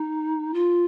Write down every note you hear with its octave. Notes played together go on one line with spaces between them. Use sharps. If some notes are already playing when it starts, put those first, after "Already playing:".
Already playing: D#4
F4